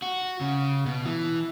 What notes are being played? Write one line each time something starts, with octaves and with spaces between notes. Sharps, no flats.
F#4
C#3
B2
E3